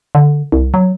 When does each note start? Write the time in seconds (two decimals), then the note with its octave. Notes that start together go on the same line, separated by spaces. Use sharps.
0.15 D3
0.52 C2
0.74 F#3